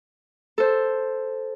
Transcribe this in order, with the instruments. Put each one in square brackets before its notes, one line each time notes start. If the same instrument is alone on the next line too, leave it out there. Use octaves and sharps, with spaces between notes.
[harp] A4 C5